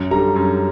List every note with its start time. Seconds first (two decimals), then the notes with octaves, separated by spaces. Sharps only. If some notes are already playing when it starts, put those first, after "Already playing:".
Already playing: F#2
0.11 D3 G3 A#5
0.36 F#2